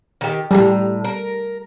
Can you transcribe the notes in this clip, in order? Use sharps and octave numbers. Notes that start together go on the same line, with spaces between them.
D#3 G4
A2 C#3 G3 A#5
A#4